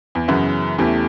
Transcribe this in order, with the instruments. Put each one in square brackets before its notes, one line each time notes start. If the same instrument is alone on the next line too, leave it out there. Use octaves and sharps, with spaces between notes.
[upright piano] E2
[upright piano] F#2 [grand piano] C#3 E3 B3 F#4 B4
[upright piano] E2 [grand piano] A3 C#4 E4 G4